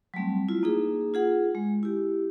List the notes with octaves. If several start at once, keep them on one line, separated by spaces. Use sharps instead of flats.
F#3 G3 A3 C4
E4 F4
A#3 D#4 G#4
F4 G#4 F#5
G#3
E4 G4